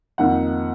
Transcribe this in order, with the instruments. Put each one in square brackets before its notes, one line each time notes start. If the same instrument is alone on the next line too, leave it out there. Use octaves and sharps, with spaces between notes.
[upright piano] F2 D#3 A#3 D#4 F#5